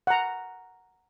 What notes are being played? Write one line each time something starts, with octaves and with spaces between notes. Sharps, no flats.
F#5 A#5